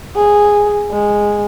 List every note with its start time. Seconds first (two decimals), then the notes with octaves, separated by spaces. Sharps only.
0.16 G#4
0.91 G#3